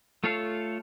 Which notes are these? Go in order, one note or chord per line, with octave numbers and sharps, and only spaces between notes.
A3 F4 A4 C#5 F5